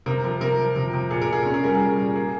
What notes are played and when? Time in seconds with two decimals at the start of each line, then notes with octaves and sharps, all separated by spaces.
0.06 C3 A#4
0.24 F3 A#4
0.41 C3 A#4
0.59 F3
0.76 C3
0.94 C3
1.10 A#2 G#4
1.22 A#4
1.28 A#2 G#4
1.43 C#4 A#4
1.54 G#4
1.63 G3 A#4
1.75 G#4
1.80 G3
1.98 A#2
2.16 A#3 G#4